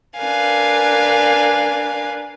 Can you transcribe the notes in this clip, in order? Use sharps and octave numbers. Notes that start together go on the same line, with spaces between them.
D4 A#4 B4 F5 G#5